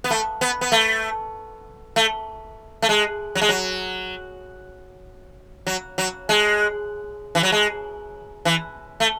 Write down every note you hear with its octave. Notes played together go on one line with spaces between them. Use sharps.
B3
A3
B3
B3
A3
A3
A3
G#3
F#3
G#3
F#3
F#3
F#3
G#3
E3
F#3
G#3
E3
A3